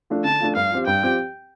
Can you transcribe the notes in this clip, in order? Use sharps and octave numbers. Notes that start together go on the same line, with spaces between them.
F3 A3 D4
D3 A5
F3 A3 D4
G2 F5
F3 C4 G4
G2 G5
F3 C4 G4